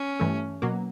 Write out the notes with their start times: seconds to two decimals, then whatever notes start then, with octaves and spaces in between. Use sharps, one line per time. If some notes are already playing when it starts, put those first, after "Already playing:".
Already playing: C#4
0.20 G2 E3 A3
0.62 B2 F#3 A#3